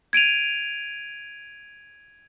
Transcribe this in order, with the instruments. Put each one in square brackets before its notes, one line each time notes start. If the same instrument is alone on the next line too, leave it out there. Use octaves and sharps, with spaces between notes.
[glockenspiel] G#6 D7 D#7 F7